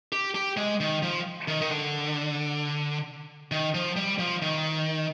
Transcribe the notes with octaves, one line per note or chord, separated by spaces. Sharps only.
G4
G4
G#3
D#3
F3
D#3
D#3
D3
D#3
F3
G3
F3
D#3